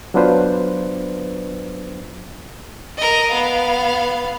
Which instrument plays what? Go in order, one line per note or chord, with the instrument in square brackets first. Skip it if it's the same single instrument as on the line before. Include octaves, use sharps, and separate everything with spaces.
[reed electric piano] F#3 B3 D4 F4 B4 C5
[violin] A#4 D#5
B3 F5